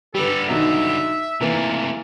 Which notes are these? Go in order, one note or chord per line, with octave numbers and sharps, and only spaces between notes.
D3 G3 G4 A4 B4
B1 B2 D#3 E5
C3 E3 A3 A#3